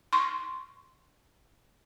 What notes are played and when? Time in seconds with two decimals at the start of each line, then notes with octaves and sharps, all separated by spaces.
0.13 C6 C#6